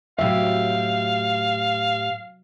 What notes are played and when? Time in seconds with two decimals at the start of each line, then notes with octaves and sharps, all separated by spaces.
0.19 A2 C3 F#3 G4 E5 F5